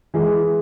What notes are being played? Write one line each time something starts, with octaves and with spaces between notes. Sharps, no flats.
E3 G#3